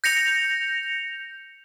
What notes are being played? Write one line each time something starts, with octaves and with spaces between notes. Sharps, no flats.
G6 A#6 C#7 F7